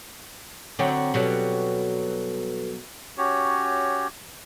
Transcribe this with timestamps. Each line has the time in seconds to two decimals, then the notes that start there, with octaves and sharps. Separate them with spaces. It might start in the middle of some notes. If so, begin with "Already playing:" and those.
0.79 D3 F#3 C4 F#5 G5 A#5
1.14 B2 F#3 G3 F#4 A4 B4
3.18 C#4 F#4 G4 C#5